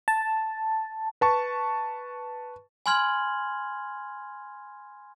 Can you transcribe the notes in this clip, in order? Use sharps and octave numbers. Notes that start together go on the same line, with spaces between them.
A5
B4 A5 C#6
G#5 B5 C6 F6 G#6 F#7